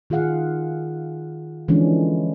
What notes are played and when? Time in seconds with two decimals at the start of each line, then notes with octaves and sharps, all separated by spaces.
0.10 D#3 F4 G#4 F5 F#5
1.68 D3 E3 F3 G#3 C#4 D4